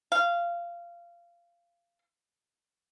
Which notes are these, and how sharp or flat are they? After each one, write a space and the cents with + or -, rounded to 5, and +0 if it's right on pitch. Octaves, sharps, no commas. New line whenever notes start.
F5 -15